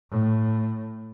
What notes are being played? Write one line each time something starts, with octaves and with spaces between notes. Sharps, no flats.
A2